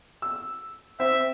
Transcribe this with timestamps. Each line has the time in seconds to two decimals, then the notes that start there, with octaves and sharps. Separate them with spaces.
0.22 E6
1.00 C4 E5